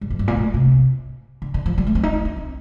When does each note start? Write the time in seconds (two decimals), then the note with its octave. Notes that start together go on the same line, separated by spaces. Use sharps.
0.01 G2
0.10 F2
0.19 G2
0.28 A#2
0.37 A2
0.54 C3
1.42 D3
1.54 D3
1.66 F3
1.78 G3
1.87 A3
1.95 C4
2.03 D#4
2.13 D4
2.25 D4
2.36 C4